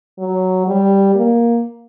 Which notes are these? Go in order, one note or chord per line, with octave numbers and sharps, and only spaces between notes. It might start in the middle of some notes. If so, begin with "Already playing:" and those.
F#3
G3
A#3